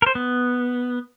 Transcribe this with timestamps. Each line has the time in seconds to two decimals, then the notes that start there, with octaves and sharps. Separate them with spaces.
0.02 A#4 C5
0.15 B3